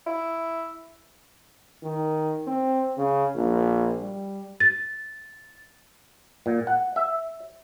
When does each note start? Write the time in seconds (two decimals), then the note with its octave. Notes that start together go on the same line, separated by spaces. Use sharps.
0.06 E4
1.83 D#3
2.47 C4
2.97 C#3
3.35 A#1
4.01 G3
4.60 A6
6.46 A#2
6.67 F#5
6.96 E5